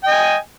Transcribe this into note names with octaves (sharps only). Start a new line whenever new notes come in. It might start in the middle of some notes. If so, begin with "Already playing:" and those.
D#5 G5 G#5